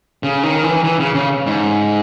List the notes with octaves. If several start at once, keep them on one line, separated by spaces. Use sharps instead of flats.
C#3
D#3
E3
E3
C#3
C#3
G#2